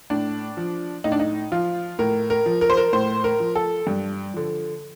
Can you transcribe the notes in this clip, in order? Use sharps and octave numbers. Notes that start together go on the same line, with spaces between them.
A2 D4
F3
A2 D#4
D4
D#4
F3 F4
A2 A#4
A#4
F3
A#4
C5
A#4
A2 C5
A#4
F3
A4
G2
D3 F3